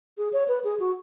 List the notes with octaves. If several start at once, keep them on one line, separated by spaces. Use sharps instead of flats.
G#4
C#5
B4
G#4
F#4